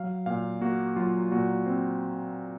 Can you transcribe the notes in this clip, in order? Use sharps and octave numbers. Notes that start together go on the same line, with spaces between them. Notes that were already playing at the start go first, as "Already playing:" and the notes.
Already playing: F#3 F5
A#2 F5
A#3 F#4
F#3 F4
A#2 F#4
C4